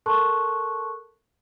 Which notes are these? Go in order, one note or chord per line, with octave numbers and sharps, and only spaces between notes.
A4 A#4 A5 C6 C#6 F#6